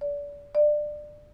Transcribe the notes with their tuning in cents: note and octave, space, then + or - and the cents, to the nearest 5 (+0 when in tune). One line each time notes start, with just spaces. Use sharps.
D5 -30
D5 +20